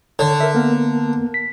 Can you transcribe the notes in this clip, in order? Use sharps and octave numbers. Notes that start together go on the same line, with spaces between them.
D3 C#5
A#4 E5
A#3 B3 A#4
B6